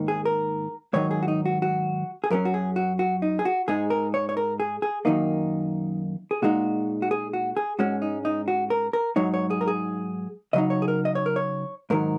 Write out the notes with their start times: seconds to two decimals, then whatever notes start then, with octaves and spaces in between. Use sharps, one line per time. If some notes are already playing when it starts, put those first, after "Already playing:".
Already playing: G#2 D#3 A#3 D#4
0.08 G#4
0.25 A#4
0.93 G#2 D#3 F#3 D#4 C#5
1.11 G#4
1.23 F#4
1.28 D#4
1.46 F#4
1.62 F#4
2.24 G#4
2.30 F#2 F#3 C#4 A#4
2.45 F#4
2.54 G#4
2.76 F#4
2.99 F#4
3.22 D#4
3.39 G#4
3.45 F#4
3.68 G#2 G#3 D#4 G#4
3.90 A#4
4.14 C#5
4.29 C#5
4.37 A#4
4.60 G#4
4.82 G#4
5.05 F#2 D#3 A#3 D#4
6.31 G#4
6.42 A#2 G#3 D#4 F#4
7.02 F#4
7.11 G#4
7.33 F#4
7.57 G#4
7.79 G#2 G#3 C#4 F#4
8.02 D#4
8.25 D#4
8.48 F#4
8.70 A#4
8.93 A#4
9.16 G#2 F#3 D#4 C#5
9.34 C#5
9.51 G#4
9.61 A#4
9.68 G#4
10.53 C#3 F#3 D#4 D#5
10.70 C#5
10.82 G#4
10.88 A#4
11.05 D#5
11.15 C#5
11.26 A#4
11.36 C#5
11.90 G#2 D#3 F#3 A#4